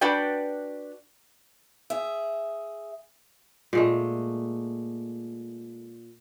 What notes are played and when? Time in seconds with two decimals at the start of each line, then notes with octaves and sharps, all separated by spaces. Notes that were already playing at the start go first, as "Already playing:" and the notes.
0.01 D4 F#4 B4 D5 G5
1.90 G#4 E5
3.73 A#2 G#3 A3